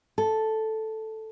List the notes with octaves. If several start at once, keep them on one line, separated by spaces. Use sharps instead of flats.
A4